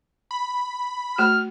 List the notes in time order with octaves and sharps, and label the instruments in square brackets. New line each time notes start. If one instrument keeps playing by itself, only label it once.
[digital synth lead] B5
[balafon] A3 F#4 [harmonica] F6